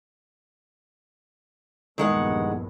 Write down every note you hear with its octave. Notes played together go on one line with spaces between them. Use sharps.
A#1 E2 G2 D#3 G#3 F#5